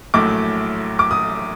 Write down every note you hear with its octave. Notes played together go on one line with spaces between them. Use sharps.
A#1 A2 F#3 A3 D6
D6
D#6